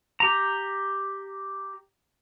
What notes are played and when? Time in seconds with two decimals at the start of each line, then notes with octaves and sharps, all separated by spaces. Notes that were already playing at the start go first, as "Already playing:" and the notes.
0.20 G4 A#5